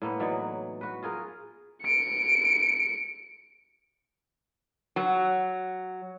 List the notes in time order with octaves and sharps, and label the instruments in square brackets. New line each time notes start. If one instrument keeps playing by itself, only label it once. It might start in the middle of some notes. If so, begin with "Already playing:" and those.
[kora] A2 A#3 B3
E3 F#3 D#4 D5
F#4 B4
F4 G#4 A#4
[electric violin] C#7 D7
[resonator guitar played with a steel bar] F#3